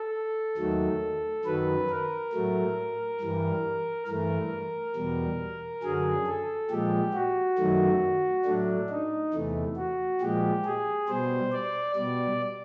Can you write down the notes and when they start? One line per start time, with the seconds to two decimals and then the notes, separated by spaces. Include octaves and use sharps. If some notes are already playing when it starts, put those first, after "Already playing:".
Already playing: A4
0.57 D#2 D#3 F#3 A3
1.45 F#2 D#3 F#3 B4
1.89 A#4
2.32 A2 F#3 A3
3.21 G2 E3 G3
4.07 G2 E3 A3 A#4
4.96 E2 B2 G3
5.83 F#2 D3 F#3 G#4
6.26 A4
6.70 A#2 F3 G#3 G4
7.14 F#4
7.58 F#2 D#3 F#3 A3
8.45 A2 F#3 A3 D4
8.89 D#4
9.33 E2 C3 E3 A3
9.76 F#4
10.21 A#2 F3 G#3 G4
10.64 G#4
11.09 B2 G3 C5
11.53 D5
11.96 B2 G3 D5